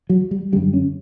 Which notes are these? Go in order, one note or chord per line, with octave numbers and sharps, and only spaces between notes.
F#3
G3
F#2 D3 G3
C#4